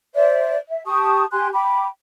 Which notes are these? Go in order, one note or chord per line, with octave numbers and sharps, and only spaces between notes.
C5 D5 E5
E5
G4 A5 C#6 D#6
G4 G#5 C6 F#6
G5 B5 D6